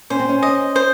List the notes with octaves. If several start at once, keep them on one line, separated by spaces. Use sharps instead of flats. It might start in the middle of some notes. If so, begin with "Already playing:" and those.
C#4 C5
C4
C#4
D#5
C5